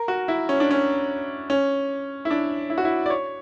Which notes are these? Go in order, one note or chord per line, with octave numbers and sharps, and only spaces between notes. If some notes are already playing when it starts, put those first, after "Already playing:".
Already playing: A#4
F#4
E4
C#4
D4
C#4
C#4
E4
D4
E4
F#4
E4
D5
C#5